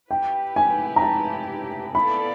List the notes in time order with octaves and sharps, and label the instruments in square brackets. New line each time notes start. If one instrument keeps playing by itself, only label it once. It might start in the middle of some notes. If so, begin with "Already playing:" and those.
[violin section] E4 G4 B4 [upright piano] G5
[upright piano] G#5
A#5
A5
[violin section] B3 E4 A4 D5 F5 [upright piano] B5